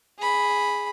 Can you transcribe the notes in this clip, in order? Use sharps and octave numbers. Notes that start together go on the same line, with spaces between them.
G#4 B5